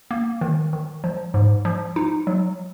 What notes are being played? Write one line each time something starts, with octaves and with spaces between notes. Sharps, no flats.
A#3
D#3
D#3
F3
G#2
F3
D#4
F#3